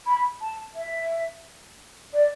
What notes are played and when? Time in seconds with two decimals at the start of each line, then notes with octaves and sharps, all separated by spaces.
0.06 B5
0.41 A5
0.75 E5
2.13 D5